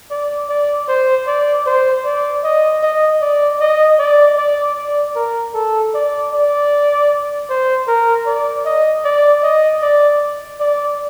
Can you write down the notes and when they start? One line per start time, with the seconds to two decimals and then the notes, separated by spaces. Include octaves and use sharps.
0.11 D5
0.49 D5
0.89 C5
1.27 D5
1.66 C5
2.05 D5
2.44 D#5
2.83 D#5
3.22 D5
3.61 D#5
3.99 D5
4.38 D5
4.77 D5
5.16 A#4
5.54 A4
5.94 D5
6.32 D5
7.50 C5
7.88 A#4
8.27 D5
8.66 D#5
9.05 D5
9.43 D#5
9.82 D5
10.60 D5